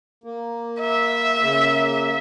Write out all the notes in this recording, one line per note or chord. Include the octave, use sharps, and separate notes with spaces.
A#3
E5
C#3 A#3